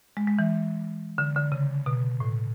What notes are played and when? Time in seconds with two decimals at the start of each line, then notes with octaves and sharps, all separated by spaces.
0.17 G#3
0.27 G#3
0.39 E3
1.18 D3
1.36 D3
1.52 C#3
1.86 B2
2.20 A2